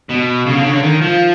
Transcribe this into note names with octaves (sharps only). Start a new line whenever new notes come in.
B2
C#3
D3
C#3
D3
D#3
F3